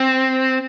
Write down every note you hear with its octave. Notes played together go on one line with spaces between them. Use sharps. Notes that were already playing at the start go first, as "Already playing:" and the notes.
Already playing: C4